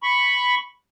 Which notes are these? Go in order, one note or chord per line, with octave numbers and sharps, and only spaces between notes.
B5 C#6